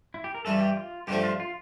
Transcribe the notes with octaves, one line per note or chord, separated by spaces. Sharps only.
E4
G4
A#4
G2 E3 G3 A4
G4
F4
G2 D3 F3 A3 G4
F4
F4